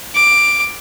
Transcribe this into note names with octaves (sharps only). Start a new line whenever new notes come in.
D6